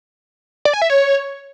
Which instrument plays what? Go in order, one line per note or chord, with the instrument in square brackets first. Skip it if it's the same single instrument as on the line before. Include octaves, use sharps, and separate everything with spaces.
[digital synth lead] D5
G#5
E5
C#5